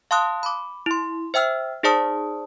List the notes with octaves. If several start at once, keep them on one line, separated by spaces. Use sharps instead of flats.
F5 A5 C6 D#6 F#6
B5 D6
E4 C6
C5 E5 G5 E6 F6
D#4 G#4 C5 D5 A5 D#6